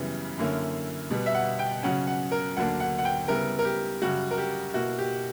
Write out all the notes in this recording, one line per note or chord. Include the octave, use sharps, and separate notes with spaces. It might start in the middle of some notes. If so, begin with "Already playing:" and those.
Already playing: F#2 C#3 E3 G3 B3
F#2 D3 A#3 C#4 E4
B2 G3 B3
E5
F#5
G5
C#3 F#3 C#4 F#5
F#5
A#4
D2 D3 F#3 A#3 D4 F#5
F#5
F#5
G5
C#3 G3 B3 E4 A#4
A#4
G4
F#2 C#3 G3 F#4
A#4
G4
B2 A#3 E4 F#4
G4